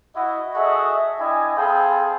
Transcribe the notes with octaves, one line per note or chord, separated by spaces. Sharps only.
E4 F#4 D#5
F#4 G#4 A4 D#5 E5 F#5
D4 E4 D#5 G5 G#5
C4 G#4 A4 F5 G5 B5